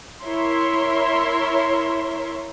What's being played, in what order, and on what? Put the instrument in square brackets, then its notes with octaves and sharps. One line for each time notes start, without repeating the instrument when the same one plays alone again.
[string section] E4 A#4 C#5 E5 C6